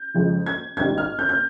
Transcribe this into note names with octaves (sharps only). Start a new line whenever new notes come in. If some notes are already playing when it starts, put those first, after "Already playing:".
Already playing: G6
F2 C#3 F3 G#3
G#6
G#1 G#2 G3 G#6
F6
G6
G6